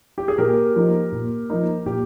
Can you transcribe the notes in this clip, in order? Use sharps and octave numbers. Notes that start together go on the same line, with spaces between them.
G4
G#4
A#2 G4 A#4
F3 A#3 D#4
A#2
F3 A#3 D#4
A#2 G4